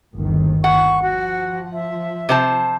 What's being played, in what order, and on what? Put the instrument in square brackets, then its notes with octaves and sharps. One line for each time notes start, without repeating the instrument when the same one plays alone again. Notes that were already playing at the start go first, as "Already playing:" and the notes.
[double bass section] G1 D#2 D#3
[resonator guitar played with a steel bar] F#5 [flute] C#6
[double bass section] F3 [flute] F#4
[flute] E5
[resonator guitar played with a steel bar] C3 C5 A5